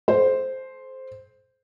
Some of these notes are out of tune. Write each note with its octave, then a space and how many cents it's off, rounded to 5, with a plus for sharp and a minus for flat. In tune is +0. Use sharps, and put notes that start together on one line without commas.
A4 -40 C5 +0